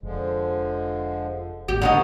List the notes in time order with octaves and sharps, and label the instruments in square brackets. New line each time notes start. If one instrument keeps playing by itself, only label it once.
[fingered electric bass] F1 [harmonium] D3 F3 G#3
[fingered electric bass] G#1 D#2 A2 [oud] G4
[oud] D3 B3 D#4 [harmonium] F3 A#3 C#5